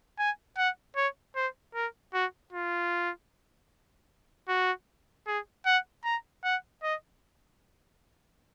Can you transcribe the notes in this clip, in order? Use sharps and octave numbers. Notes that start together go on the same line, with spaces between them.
G#5
F#5
C#5
C5
A#4
F#4
F4
F#4
G#4
F#5
A#5
F#5
D#5